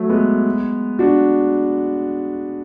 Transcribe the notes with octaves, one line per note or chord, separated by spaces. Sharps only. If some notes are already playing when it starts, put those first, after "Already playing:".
Already playing: F#3 A3
G#3 B3
D4 F#4